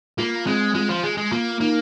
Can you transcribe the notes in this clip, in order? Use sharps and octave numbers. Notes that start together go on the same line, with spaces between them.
A#3 F4
G#3 C4
G#3 F4
F3
G#3
G#3
A#3 F4
A#3 D#4